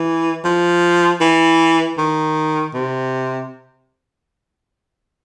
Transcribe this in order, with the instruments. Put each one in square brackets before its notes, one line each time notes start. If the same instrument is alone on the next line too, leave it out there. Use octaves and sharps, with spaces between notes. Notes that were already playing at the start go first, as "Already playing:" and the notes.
Already playing: [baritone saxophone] E3
F3
E3
D#3
C3